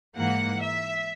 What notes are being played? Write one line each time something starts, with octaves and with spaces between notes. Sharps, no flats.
G#2 E3 A#3 F#5
E5